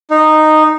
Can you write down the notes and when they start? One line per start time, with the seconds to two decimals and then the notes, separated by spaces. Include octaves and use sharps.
0.11 D#4